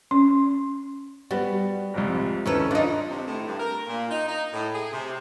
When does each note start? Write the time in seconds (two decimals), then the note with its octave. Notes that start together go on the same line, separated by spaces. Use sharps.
0.11 C#4
1.31 G3 B3 F#4
1.94 C2 F2 G#2
2.46 D#2 D#3 C#4 E4 A4 B4
2.71 D4 D#4 F4 B4 D5
3.10 C3
3.27 A2
3.47 G2
3.60 A#4
3.87 A#2
4.11 D#4
4.28 D#4
4.53 A2
4.74 G#4
4.92 C3